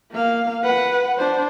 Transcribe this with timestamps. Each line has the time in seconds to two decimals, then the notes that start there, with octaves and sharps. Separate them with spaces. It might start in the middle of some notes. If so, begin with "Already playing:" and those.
0.12 A#3 F5
0.63 B4 F#5
1.18 D4 C5